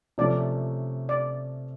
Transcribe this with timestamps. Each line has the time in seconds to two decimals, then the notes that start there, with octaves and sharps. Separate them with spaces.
0.18 C3 F3 A3 C#4 D5
1.09 D5